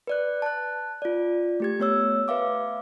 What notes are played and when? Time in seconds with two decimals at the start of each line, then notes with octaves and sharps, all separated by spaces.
0.07 B4 D5 F#6
0.42 A5 F#6
1.02 F4 D5
1.60 A3 G4 G#6
1.79 A3 B3 C#5 E6
2.28 B4 E5 F5 D6